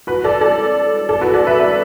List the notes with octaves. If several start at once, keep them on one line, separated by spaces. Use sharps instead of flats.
F#4 B4
A4 D5
A4 D5
A4 D5
F#4 B4
A4 D5
B4 E5
B4 E5